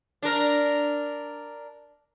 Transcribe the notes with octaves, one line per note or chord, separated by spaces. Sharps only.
D4 A#4